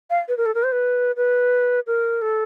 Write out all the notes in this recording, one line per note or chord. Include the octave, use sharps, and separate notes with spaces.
F5
B4
A#4
A4
A#4
C5
B4
B4
A#4
A4